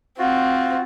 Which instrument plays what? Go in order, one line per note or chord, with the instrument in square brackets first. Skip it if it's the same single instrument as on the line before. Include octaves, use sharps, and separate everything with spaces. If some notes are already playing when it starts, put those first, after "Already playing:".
[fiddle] C4 [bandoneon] F4 F#4